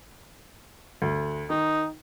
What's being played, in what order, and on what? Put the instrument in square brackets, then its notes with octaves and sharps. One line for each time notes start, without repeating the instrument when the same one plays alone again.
[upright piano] D2
[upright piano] D#3 [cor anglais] D#4